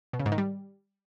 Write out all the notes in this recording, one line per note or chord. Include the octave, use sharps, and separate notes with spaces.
B2
C#3
G#2
D#3
G3